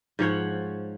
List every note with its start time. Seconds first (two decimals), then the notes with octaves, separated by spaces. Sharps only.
0.19 G#2 F3 C#5 F#5